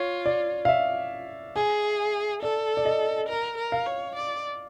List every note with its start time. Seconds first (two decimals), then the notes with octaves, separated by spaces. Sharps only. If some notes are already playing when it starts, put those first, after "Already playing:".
Already playing: F4 C#5
0.26 D5
0.65 F5
0.69 E5
1.56 G#4 G#5
2.42 A4 D5
2.77 D5
2.85 D#5
3.29 A#4
3.58 A#4
3.72 F5
3.86 C#5
4.16 D5